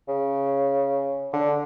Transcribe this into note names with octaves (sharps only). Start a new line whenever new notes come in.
C#3
D3